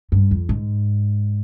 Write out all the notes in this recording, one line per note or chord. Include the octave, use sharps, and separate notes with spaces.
G2
F2
G#2